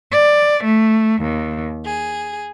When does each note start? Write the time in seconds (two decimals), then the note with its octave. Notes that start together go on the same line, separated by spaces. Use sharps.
0.11 D5
0.63 A3
1.21 D#2
1.84 G#4